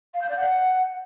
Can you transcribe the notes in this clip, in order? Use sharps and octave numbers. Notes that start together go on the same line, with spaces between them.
F5
G6
D5
F#5